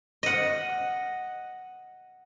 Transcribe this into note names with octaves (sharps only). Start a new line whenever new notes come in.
D#5 F#5